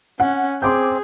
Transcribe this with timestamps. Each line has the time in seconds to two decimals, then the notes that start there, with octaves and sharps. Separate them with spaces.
0.20 C#4 F#5
0.62 C4 G#4 C6 D6 G6